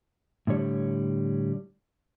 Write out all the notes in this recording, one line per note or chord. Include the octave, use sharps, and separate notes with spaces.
A2 D3 G3 C#5